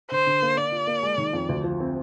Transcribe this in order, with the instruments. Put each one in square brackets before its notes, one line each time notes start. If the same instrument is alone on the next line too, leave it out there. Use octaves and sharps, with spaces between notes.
[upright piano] D3 [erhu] C5
[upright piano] D3
A#3
[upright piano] A#3 [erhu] D5
[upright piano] F4
A#3
G#3
D#3
F2
D2
F3
C4